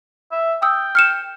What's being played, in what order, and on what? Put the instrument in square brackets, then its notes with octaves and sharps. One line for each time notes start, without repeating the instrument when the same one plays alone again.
[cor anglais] E5
[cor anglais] G5 [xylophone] D#6 E6
[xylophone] F6 C#7 E7